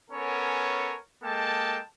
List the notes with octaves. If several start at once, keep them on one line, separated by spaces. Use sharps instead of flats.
B3 C#4 A4 A#4 C#5 G#5
G#3 A#3 A4 G5 A5